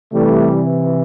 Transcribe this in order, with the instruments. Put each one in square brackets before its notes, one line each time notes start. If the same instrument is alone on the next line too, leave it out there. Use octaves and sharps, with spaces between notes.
[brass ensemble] C3 E3 G3 A3